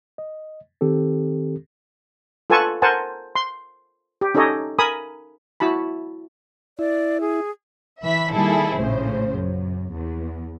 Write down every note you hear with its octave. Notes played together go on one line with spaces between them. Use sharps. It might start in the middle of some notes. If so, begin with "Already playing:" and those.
D#5
D#3 C4 G4 A4
F4 A4 B4 G#5 A5 C#6
A#4 C5 F#5 G#5 A5
C6
G4
C#4 D#4 G4 A4 C#5 D#5
A#4 G#5 B5 D#6
E4 F#4 A5 B5
E4 D5
G#4
E3 E5 B5 B6
D#3 G3 A#3 E4 G#4 A4
A#1 A2 C#3 C5
F#2
E2